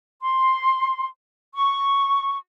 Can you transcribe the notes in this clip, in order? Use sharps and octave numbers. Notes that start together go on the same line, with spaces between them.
C6
C#6